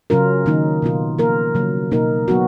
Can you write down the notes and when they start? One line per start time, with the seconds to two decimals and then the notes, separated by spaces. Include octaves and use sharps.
0.10 C#3 F#3 C#4 F4 A#4
0.46 D#3 F#3 A#3 D#4
0.82 B2 F#3 B3 F4
1.19 F3 A#3 F4 A#4
1.55 C#3 F#3 A#3
1.91 B2 A#3 D#4 A#4
2.28 F#3 B3 F#4